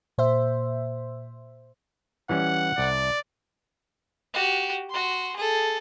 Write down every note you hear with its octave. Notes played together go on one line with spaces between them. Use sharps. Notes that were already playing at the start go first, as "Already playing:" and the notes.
A#2 C5 E5
E3 G3 C#4 F#5
C2 D5
F#4 G4
F#4 C6
G#4 A4